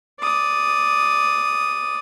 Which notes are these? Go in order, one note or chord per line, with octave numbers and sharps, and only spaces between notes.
D5 D#6